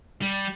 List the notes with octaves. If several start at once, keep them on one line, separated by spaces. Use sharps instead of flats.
G3